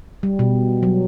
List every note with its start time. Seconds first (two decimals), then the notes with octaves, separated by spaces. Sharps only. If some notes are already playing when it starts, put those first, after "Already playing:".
0.23 G3
0.39 B2
0.83 F#3